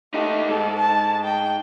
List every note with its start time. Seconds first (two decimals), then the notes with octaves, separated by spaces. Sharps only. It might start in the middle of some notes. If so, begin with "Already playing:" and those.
0.14 A3 D#4 G4
0.49 G#2 A4
0.80 A5
1.24 G5